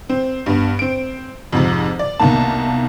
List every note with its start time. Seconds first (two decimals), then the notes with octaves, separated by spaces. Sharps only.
0.09 C4
0.46 G2 B3
0.79 C4 D7
1.52 F2 G#2 C3
1.99 D5
2.20 C2 B2 D#3 A#3 A5